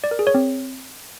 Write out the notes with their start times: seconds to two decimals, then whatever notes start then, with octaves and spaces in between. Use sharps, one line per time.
0.04 D5
0.11 A#4
0.19 G#4
0.27 C#5
0.34 C4